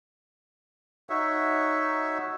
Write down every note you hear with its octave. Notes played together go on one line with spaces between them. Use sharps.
D#4 F#4 C#5 E5